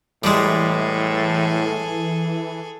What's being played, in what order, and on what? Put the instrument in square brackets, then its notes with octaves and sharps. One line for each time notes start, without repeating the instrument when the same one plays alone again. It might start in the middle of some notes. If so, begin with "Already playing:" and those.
[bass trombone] A2 [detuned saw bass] E3 [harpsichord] G3 G#3 [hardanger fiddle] G#4 A4